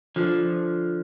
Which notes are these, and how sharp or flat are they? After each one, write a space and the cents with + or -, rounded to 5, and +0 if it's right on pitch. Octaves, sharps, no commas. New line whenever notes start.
D3 +0 F3 +0